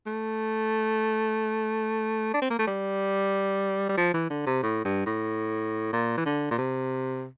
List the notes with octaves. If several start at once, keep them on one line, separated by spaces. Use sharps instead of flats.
A3
D4
C4
A#3
A3
G3
G3
F3
E3
D3
C3
A2
G2
A2
A#2
E3
D3
A#2
C3